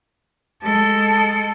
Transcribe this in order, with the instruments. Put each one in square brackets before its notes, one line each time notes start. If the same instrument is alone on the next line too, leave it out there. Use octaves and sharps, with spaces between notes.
[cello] G#3 A4